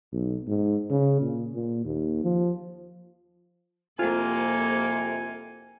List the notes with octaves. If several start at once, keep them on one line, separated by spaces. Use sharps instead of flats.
B1
G#2
C#3
A#2
A#2
D#2
F3
C2 F2 C3 A#3 F4 A4 G#5